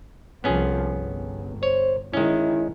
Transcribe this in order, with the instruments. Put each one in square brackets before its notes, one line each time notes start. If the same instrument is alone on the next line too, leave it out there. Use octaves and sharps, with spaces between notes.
[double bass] C2 F3 [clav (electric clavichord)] B3 C#4 G#4
[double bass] G1
[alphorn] C5 [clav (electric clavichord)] C#5
[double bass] D#3 [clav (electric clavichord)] G#3 C#4 [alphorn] E4